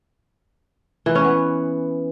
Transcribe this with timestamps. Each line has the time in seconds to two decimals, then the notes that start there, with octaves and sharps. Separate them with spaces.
1.06 E3
1.15 C#4
1.25 B3